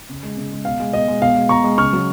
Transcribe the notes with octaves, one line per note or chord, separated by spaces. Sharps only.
C#3
G#3
C#3
G#3
B2 F5
G#3
B2 D#5
G#3
B2 F5
G#3
B2 A#5 C#6
G#3
C#3 C#6 F6
F#3